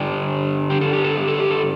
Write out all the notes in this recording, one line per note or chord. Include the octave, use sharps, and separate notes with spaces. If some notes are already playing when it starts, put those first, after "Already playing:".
Already playing: G2 D3 G3 D4 G4
G4
A4
G4
A4
G4
A4
G4
A4